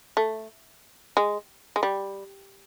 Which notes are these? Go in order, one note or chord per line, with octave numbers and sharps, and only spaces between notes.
A3
G#3
G#3
G3